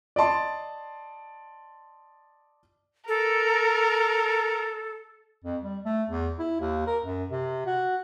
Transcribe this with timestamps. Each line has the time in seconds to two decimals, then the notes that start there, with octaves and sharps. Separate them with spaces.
0.16 D5 D#5 A5 C6
3.08 A4 A#4
5.44 F2
5.63 G3
5.85 A3
6.09 E2
6.39 E4
6.60 D#2
6.87 A#4
7.03 F#2
7.30 C3
7.66 F#4